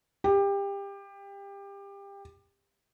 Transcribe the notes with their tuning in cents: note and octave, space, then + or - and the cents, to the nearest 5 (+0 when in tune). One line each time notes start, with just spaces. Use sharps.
G4 +25